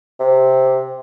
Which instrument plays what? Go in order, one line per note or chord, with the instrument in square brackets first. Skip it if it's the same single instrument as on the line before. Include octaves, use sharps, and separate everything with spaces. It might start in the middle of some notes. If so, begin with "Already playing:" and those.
[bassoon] C3